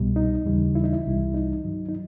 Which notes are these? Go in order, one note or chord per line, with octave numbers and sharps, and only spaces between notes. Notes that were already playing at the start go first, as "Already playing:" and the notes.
Already playing: C2 B2 G3
D#4
D#2 C#3 E3 G3
E4
D#4
E4
C2 C3 E3 G3
D#4
G2 D#3 F#3
D#4